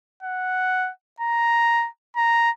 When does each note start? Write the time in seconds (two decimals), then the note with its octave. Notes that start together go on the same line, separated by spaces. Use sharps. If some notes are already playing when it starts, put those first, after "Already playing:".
0.23 F#5
1.20 A#5
2.16 A#5